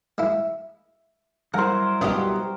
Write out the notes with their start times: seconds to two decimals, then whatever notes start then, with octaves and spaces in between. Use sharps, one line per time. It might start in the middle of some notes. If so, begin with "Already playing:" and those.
0.18 G#3 E4
1.54 F#3 G3 E4 A#4 C5 F#5
2.01 C#2 B2 B3 D4 G4 D#5